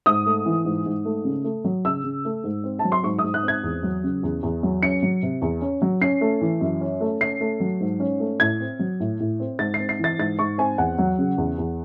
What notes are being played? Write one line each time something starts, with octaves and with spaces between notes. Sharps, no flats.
G#2 D#6
A3
E3
G#2
G#2
A3
C#3
A3
F#3
C#3 E6
C#3
A3
G#2
C4
F#3 A5
C6
G#2 C#6
D#6
G#2
F#6
C4 G#6
E2
F#3
C#3
E2
E2
F#3
C#4 C#7
F#3
C3
E2
C#4
F#3
C#4 C7
A3
E3
F#2
C#4
A3
C#4 C7
A3
F#3
G#2
C#4
A3
A2 G#6
C4
F#3
A2
A2
C4
G#2 A6
C7
C4
C7
E3 A6
G#2 A6
G#2 C#6
C4 G#5
E2 F#5
F#3
C#3
E2
E2